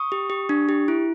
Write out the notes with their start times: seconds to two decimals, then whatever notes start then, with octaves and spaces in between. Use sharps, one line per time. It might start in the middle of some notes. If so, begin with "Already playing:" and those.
Already playing: C#6 D#6
0.12 G4
0.30 G4
0.49 D4
0.69 G4
0.88 E4